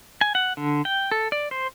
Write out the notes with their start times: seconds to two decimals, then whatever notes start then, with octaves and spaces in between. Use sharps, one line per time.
0.21 G#5
0.35 F#5
0.57 D3
0.85 G5
1.11 A4
1.32 D5
1.51 C5